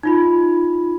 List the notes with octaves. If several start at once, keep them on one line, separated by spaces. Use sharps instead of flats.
D#4 F4 B5